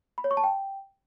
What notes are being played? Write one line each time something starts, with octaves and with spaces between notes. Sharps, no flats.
B5
C#5
C#6
A5
G5